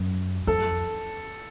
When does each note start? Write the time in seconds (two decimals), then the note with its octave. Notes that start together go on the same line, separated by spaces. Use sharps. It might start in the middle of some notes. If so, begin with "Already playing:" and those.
Already playing: F#2
0.47 F2 A4